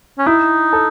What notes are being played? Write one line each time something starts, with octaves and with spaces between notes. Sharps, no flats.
C#4
D#4 E4
A4